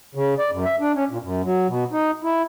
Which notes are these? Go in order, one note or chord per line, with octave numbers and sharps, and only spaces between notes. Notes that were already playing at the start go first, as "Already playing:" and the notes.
C#3
D5
F#2
E5
D4
C#4
A#2
F#2
F#3
B2
D#4
E4